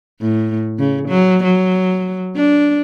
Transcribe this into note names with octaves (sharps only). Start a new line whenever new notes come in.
A2
C#3
F#3
F#3
D4